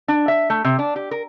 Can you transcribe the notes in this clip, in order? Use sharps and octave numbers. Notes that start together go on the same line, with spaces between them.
D4
E5
A3
C3
D4
G4
A#4